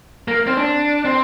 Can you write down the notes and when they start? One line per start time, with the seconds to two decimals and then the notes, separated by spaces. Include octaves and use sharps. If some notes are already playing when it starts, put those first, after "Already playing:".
0.28 A#3
0.47 C4
0.57 D4
1.05 C4